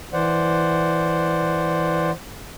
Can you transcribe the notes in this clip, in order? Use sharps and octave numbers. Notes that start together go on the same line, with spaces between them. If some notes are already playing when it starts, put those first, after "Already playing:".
E3 C5 D5 F#5